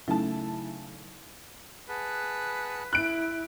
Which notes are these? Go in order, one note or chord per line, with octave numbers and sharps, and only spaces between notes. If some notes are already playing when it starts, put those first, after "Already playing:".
C#3 F#3 A3 D#4 E4 A5
G#4 B4 F#5 A5
E4 F#6 D7